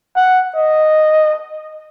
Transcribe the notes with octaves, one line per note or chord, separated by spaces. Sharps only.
F#5
D#5